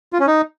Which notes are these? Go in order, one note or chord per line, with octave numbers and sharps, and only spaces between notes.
F4
C#4
D#4